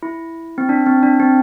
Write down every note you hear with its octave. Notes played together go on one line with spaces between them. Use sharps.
E4
C4
D4
C4
D4
C4